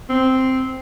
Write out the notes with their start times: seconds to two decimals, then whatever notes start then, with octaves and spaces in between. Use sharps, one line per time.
0.09 C4